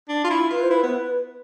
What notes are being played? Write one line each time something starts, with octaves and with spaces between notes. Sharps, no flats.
D4
F4
E4
F4 B4
C5
E4 B4
B3